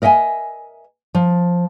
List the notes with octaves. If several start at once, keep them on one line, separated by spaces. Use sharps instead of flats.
A#4 D#5 E5 G5 G#5
F3